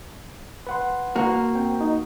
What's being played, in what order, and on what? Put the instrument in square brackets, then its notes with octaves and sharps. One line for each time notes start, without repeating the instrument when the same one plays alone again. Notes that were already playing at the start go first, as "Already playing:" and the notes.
[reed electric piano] B4 F#5 C6
[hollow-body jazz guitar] A#3 F#4
[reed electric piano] C4 G5
D#4